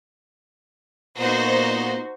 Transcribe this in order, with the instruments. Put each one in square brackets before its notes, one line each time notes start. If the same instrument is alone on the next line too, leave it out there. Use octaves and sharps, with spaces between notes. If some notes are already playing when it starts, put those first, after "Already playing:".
[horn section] A#2 B3 [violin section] D#4 F#4 C5